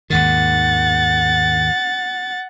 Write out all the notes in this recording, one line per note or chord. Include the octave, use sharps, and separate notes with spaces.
D#2 G#2 D#3 F#5 A6